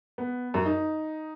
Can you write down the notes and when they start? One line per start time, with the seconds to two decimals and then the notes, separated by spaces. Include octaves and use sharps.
0.18 B3
0.54 F#2
0.66 D#4